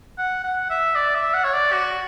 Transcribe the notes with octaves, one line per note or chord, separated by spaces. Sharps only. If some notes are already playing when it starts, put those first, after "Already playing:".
F#5
F#5
E5
D5
E5
F#5
C#5
D5
F#4